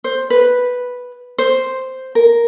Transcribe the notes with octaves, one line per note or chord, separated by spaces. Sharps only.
C5
B4
C5
A#4